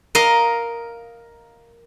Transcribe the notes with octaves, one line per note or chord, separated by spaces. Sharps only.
A#4 D#5 F5